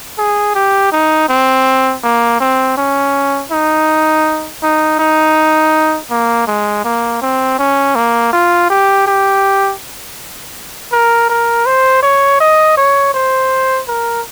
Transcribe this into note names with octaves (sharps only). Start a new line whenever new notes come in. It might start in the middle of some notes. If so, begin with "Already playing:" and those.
G#4
G4
D#4
C4
A#3
C4
C#4
D#4
D#4
D#4
A#3
G#3
A#3
C4
C#4
A#3
F4
G4
G4
A#4
A#4
C5
C#5
D#5
C#5
C5
A#4